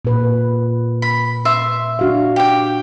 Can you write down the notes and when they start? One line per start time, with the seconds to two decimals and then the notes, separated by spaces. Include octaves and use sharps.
0.05 A#2 B4
1.02 B5
1.45 E5 C6
1.99 D4 F#4 F5
2.36 G4 G5